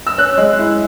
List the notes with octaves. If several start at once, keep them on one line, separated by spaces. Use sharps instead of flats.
E6
C#4 F#6
G#3
E4